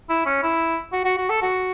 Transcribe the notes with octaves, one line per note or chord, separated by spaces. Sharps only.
E4
C#4
E4
F#4
F#4
F#4
A4
F#4